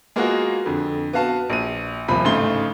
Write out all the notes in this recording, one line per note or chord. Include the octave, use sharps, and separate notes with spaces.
G#3 A#3 B3 F4 F#4 G#4
F2 D3
B3 F#4 F5 A5
A#1 D#7
D#1 C3 F3 B5
A1 G#2 C#3 A3 C6 G7